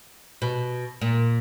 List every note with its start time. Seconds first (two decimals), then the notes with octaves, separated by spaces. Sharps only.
0.42 B2
1.01 A#2